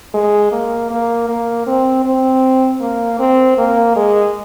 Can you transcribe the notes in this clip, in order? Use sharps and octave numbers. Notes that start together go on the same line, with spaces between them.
G#3
A#3
A#3
A#3
C4
C4
A#3
C4
A#3
G#3